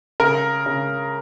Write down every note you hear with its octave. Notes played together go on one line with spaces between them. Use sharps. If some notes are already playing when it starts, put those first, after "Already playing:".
C#3 A#4
C#3